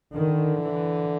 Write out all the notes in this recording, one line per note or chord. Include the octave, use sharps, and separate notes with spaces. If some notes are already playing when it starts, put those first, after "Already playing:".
D3 D#3
E3